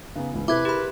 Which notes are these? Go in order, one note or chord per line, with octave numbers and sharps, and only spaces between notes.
C#3 B3 D#4
C#2 G#2 E3
C3 E4 G4 A4 B4 D6 G#6
G4 G#4 A#4 B5